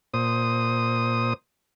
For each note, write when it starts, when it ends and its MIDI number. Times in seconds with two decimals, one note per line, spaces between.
0.14 1.33 46
0.14 1.33 72
0.14 1.33 87